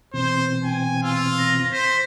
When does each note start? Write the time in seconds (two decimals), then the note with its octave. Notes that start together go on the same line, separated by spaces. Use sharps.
0.14 B2 E3 C4 C5
0.64 G5 G#5
1.03 F4 E6
1.38 A#6
1.72 C5 B6